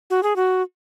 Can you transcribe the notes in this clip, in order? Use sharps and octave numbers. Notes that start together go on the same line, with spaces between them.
F#4
G#4
F#4